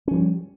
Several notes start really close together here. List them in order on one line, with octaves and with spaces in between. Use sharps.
C#4 F3 G3